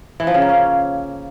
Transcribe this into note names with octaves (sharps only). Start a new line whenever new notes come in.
E3
F3
C#3
A#3
C#4